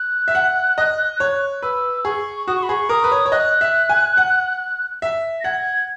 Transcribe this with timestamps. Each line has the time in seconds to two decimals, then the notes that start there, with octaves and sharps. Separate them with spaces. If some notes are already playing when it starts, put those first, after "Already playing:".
Already playing: F#6
0.28 E5
0.35 F#5
0.78 D#5
1.20 C#5
1.63 B4 E6
2.05 G#4 C#6
2.47 F#4 D#6
2.55 C#6
2.63 B5
2.69 G#4 C#6
2.89 A#4 D#6
3.04 B4
3.12 C#5
3.26 C#5
3.32 D#5 F#6
3.61 E5
3.89 G#5
4.17 F#5
5.02 E5
5.40 A#6
5.44 F#5 G#6